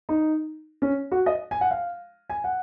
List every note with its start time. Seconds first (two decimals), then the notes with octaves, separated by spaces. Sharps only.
0.09 D#4
0.82 C#4
1.11 F#4
1.26 D#5
1.51 G#5
1.61 F#5
1.71 F5
2.30 G#5
2.44 F#5